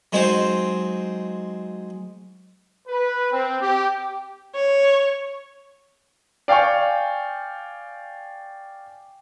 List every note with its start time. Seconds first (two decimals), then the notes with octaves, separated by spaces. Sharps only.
0.13 F#3 G#3 C4 D#4 C5
2.88 B4
3.31 C4
3.60 G4
4.55 C#5
6.48 D5 F5 G5 G#5 C#6